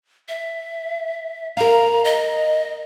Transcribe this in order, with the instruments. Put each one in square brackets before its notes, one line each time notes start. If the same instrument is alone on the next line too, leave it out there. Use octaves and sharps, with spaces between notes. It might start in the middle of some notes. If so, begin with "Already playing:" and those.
[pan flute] E5
[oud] A#4 F5 [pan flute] A#5
[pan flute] D#5